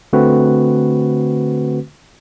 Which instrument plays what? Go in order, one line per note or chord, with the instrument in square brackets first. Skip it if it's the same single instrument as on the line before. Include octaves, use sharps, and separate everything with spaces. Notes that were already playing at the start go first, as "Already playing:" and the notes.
[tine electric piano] D3 A3 C4 F#4 B4